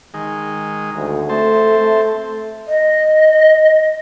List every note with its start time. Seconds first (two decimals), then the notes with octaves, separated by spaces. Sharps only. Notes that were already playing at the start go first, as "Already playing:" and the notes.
0.14 D#3 G#3
0.96 D2
1.29 A3 C4 C5 A5
1.79 A3
2.66 D#5